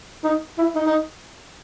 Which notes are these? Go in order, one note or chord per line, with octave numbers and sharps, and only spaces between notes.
D#4
E4
D#4
D#4